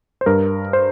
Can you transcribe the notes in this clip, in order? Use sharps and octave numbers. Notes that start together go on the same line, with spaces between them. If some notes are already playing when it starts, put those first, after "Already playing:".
C5
G2 A#4
C5